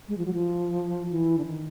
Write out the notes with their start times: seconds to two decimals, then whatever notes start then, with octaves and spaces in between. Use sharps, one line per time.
0.08 G#3
0.18 F3
0.26 F#3
0.34 F3
1.11 E3
1.38 D3
1.46 D#3